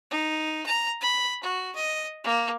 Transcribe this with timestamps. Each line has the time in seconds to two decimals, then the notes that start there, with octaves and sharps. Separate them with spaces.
0.11 D#4
0.66 A#5
1.01 B5
1.43 F#4
1.75 D#5
2.24 A#3